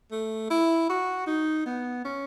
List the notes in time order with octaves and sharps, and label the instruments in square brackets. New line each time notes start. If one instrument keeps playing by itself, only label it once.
[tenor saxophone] A3
E4
F#4
D#4
B3
C#4